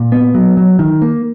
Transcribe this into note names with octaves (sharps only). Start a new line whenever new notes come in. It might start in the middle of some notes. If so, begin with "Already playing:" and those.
Already playing: A#2
B3
F#3
F#3
D#3
A#3